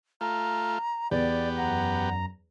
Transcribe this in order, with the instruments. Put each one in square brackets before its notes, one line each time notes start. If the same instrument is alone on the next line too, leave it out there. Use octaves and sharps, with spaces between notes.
[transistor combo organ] A3 F4 [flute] A#5
[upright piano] E2 [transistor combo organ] B3 G4 [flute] D5
[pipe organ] F#2 A#5 [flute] F#5